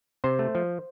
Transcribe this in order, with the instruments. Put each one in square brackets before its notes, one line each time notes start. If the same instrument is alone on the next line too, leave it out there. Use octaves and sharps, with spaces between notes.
[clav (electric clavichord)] C3 C5
A3
F3